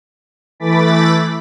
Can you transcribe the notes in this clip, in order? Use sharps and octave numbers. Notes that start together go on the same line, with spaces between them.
E3 A3 B5 D6 A6 B6